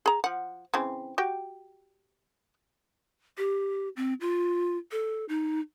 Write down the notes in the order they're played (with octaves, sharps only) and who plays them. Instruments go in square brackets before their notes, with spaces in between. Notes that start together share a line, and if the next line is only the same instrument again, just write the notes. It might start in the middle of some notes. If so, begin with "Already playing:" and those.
[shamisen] G#4 A#5
F3 F#5
C#3 E3 C4
F#4 G4 G5
[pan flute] G4
C4
F4
A4
D#4